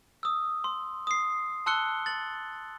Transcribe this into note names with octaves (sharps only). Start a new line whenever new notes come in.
D#6 E6
C6
D#6 C7
A5 C6 E6 F#6 C#7 G7
A6 F#7